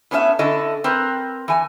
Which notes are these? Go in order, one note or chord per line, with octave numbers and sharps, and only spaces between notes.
A2 B3 C#4 A4 E5
D3 C#4 E4 A4 D#5
C4 A#4 B4
E3 G#5